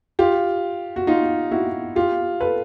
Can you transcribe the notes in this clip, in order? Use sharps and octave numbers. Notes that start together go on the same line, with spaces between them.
F4 G4
F#4
D#4 F4
E4 F#4
F4 G4
A4 B4